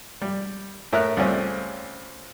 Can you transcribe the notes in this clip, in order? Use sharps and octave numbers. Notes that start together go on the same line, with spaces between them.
G3
A2 A3 A#4 E5 F#6
C#2 G3 A3 C4 C#4